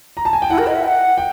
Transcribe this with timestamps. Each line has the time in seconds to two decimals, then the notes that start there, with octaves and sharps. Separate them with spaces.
0.17 A#5
0.25 A5
0.33 G#5
0.42 G5
0.50 E4 F#5
0.58 A#4
0.67 D#5
0.75 E5
0.83 G5
0.88 F#5
1.18 G5